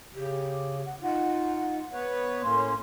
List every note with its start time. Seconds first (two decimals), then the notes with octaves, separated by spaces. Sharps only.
0.15 C#3 G4
0.86 F#5
1.02 D#4 F4 F#5
1.93 B3 B4 C#5
2.42 A2 A#3 C#4 C6